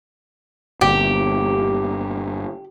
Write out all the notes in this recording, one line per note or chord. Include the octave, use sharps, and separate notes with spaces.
G1 A#2 D3 G4